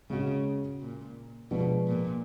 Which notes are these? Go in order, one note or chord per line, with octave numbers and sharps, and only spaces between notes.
C#3 G#3 C#4 F#4
A#2
B2 F3 G#3 B3 D4
A#2